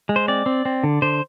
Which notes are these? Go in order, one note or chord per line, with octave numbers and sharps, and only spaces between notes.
G#3
C5
C4 D5
C4
C4
D3
D3 C5